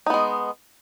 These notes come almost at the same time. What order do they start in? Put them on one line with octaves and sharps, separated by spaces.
D#4 B3 G#3